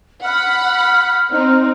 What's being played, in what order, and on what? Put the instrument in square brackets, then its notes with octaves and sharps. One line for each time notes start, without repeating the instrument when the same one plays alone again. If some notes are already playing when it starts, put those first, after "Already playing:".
[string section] F#5 B5 [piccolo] F6
[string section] C4 D#4